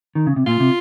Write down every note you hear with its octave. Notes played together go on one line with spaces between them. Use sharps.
D#3
C#3
C3
A#2 F4
C3